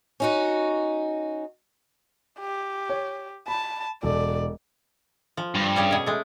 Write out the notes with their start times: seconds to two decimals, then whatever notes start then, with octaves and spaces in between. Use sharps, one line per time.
0.20 C#4 D#4 F#4
2.39 G4
2.90 C#5
3.48 A5 B5
4.03 E1 A4 D5
5.37 F3
5.54 G2
5.76 G3 C#4 G#4
5.91 B2 G#4
6.06 G#3 A3